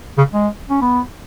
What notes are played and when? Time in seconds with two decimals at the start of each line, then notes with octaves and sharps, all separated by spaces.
0.18 C#3
0.33 G#3
0.70 C#4
0.81 B3